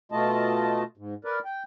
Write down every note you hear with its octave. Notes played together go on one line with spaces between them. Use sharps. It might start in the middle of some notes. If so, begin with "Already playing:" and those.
B2 A3 F4 D#5 A5
G#2
A#4 B4 D5
G5